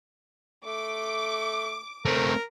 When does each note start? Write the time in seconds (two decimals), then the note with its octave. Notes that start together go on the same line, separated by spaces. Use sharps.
0.65 A3 D6
2.05 A3 C4 A#4